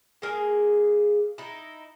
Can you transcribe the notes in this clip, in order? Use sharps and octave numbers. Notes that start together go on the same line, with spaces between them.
G#3 A#3 G#4
D#4 E4